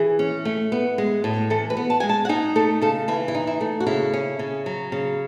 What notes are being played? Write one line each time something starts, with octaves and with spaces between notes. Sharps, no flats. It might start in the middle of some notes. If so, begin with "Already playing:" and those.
Already playing: E3 G#4
C#4
A3
B3
G#3
A2
E3 A4
B4
B3
A5
G#3 G#5
A5
F#5
D#4 G#5
A3 A4
C#3 A4
E3 E4
E4
D#4
E4
A3
F#4
C#3 E4
C#4
C#3
F#3
C#3